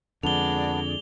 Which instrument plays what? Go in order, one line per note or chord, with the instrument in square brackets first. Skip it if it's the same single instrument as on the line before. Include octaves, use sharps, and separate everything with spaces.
[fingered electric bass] F2 D3 [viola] G#3 D5 [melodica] B3 D4 [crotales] F7 G7